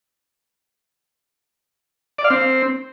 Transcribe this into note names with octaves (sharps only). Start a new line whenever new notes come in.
D5
F5
C4